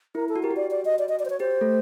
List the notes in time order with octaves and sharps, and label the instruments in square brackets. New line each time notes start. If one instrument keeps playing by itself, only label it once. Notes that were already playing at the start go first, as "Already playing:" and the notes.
[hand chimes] E4 [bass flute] A#4
[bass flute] A4
[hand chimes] F#4
[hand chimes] G4 [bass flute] A#4
[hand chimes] F#4
[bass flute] D5
D5
D#5
D5
D#5
D5
C5
C#5
[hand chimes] G4 [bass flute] C5
[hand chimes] A3 A4